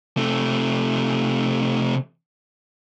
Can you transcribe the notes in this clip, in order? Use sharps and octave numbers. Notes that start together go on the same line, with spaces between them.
C3 A3